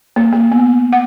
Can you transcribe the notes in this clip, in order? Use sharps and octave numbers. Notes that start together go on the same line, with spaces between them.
A#3
A#3
B3
F#5